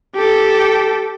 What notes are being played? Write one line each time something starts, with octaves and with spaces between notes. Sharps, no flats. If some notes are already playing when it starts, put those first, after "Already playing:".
G4 A4